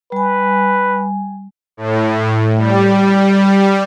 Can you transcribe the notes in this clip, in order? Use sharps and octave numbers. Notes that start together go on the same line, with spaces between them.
G3 B4 G#5
A2
G3